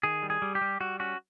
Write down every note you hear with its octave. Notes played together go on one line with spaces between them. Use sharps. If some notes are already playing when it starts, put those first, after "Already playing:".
D#3 G#4
G3
G#4
G3
G4
G3
G3 F#4
C#4 F#4